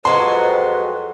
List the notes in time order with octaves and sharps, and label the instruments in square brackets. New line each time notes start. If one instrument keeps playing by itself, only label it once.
[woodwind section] F2 [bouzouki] F#3 G#3 F#4 [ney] B4 [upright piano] C6